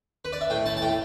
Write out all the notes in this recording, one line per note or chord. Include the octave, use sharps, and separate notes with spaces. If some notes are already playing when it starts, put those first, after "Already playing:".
B4
D5
E5
A2 G5
E4 A5
A5
A2 G5